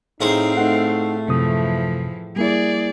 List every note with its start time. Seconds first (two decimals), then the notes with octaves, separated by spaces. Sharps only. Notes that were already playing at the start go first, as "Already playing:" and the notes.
0.21 A2 C4 D#4 G#4 C5 F5
0.57 A3 D#4 F#5
1.28 F#2 C3 E3 F3 D#6
2.36 G3 A#3 E4 G#4 D5